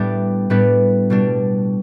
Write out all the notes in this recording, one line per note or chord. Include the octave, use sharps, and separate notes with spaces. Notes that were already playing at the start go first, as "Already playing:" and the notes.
Already playing: A2 G3 B3 D4 D5 E5 G5
A2 G3 B3 D4 B4
B2 G3 D4